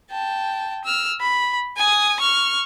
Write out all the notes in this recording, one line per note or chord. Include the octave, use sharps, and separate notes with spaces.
G5 A5
E6 F6
B5
G#5 D#6
C#6 F6